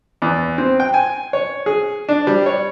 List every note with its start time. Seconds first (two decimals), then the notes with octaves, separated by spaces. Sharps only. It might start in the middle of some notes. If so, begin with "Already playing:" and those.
0.22 E2
0.58 C4
0.80 G5
0.94 G#5
1.33 C#5
1.66 G#4
2.09 D4
2.27 G3
2.46 C#5